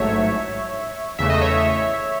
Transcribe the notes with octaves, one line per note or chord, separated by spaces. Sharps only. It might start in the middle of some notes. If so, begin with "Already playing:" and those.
Already playing: A1 G#2 F#3 A3 C#5 E5
E2 C#3 E3 A3 E5
D#5
C#5 E5